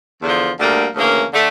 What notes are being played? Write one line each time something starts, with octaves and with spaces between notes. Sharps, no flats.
E2 D3 F3
D2 D3 G3 A#3
D2 C#3 E3 A#3 C#4
D3 A3